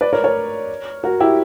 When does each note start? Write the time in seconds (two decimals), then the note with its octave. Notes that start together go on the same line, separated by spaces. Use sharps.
0.01 B4 D5
0.13 A#4 C#5
0.24 A#4 C#5
1.04 F#4 A#4
1.20 E4 G4